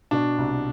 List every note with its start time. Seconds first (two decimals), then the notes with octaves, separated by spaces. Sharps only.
0.11 B2 D4
0.38 C2